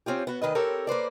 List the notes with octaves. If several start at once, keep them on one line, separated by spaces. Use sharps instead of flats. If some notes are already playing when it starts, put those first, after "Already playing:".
C4 C#4 F4 G4
B3 F#4
D2 D#3 B4 D#5
C4 G4 A4 A#4 C#5
A#3 B4 C5 D5